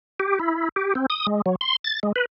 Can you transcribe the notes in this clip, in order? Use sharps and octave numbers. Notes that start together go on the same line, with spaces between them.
G4
E4
G4
C4
D#6
G#3
F#3
C6
A6
G#3
B4